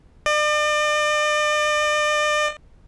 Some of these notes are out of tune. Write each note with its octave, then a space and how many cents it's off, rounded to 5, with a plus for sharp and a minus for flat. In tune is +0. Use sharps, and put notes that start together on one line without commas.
D5 +40